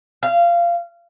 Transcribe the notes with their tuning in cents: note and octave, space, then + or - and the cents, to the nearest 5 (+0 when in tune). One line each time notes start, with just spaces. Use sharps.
F5 -20